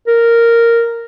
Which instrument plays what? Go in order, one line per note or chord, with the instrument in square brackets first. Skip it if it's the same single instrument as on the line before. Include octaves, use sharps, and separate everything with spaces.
[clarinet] A#4